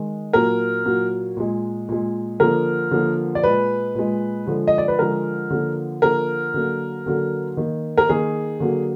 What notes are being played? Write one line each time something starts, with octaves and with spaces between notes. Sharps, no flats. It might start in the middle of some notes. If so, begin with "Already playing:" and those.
Already playing: D#3 G#3
A#2 F#3 A#3 A#4
A#2 F#3 A#3
A#2 G#3
A#2 G#3
D3 F3 A#3 A#4
D3 F3 A#3
D5
A#2 G#3 B4
A#2 G#3
D3 F3 G#3
D#5
D5
B4
D3 F3 G#3 A#4
D3 F3 A#3
D3 F3 A#3 A#4
D3 F#3 A#3
D3 F#3 A#3
D#3 A#3
A#4
D#3 A#3 G#4
D3 F#3 A#3